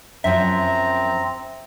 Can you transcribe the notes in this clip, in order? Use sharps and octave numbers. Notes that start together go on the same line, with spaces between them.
F#2 F3 C4 E5 A#5